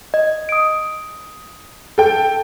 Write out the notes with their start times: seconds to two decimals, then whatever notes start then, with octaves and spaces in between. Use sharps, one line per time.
0.14 D#5
0.49 D#6 D7
1.98 A4 G5